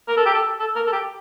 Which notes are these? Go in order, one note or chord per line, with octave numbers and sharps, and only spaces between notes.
A#4
A4
G4
A4
A4
A#4
A4
G4